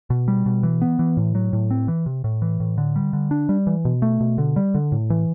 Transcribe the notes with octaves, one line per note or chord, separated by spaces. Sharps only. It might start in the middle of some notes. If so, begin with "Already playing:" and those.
B2
G3
B2
E3
B3
E3
A2
F#3
A2
C4
E3
C3
A2
E3
A2
D3
G3
D3
D4
G3
E3
B2
A3
B2
D3
G3
D3
A2
E3